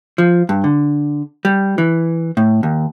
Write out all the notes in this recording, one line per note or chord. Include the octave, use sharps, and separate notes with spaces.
F3
G2
D3
G3
E3
A2
D#2